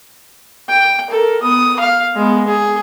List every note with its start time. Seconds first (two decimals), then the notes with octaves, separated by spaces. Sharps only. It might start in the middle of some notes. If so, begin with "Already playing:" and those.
0.69 G5
1.10 A4 A#4
1.42 B3 D#6
1.80 F5
2.15 G#3 B3
2.47 G#4